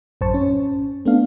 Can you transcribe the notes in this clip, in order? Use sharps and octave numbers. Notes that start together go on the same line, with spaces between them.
A1 F#2 C5 A5 C#6
C#4
A3 B3 D4 F5